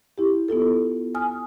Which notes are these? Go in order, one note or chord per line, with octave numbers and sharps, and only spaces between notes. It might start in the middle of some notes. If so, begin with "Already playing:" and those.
E4 G4
B3 E4 F4 A4
G#5 D#6 F6